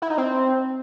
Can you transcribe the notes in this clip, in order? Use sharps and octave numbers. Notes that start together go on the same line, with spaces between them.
E4
D#4
C4